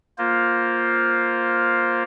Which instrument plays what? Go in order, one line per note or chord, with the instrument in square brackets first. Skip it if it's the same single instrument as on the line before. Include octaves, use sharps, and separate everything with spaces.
[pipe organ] A#3 F4 C5